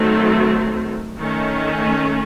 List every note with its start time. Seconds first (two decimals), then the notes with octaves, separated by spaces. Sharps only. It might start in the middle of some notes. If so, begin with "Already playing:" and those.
Already playing: D#3 F#3 A3 C4
1.21 D#3 A3 C#4